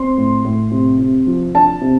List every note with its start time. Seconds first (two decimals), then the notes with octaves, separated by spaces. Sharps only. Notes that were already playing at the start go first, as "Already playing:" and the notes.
Already playing: C4 C6
0.17 A2
0.45 A2
0.71 C3
0.99 C3
1.27 F3
1.55 D4 A5
1.81 C3